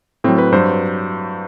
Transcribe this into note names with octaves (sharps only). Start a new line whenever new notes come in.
A2 F#3 C4
B4
G2 F#3 C5